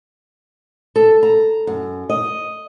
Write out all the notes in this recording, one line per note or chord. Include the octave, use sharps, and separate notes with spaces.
A4
A#5
F#2
D#5